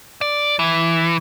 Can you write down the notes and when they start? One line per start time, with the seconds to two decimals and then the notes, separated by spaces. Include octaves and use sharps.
0.21 D5
0.59 E3